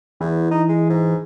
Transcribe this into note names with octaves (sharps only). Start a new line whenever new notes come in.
E2 E3
D#4
G#3
G#2